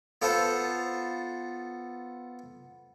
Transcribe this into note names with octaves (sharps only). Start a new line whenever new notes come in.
B3 F4 A4 C5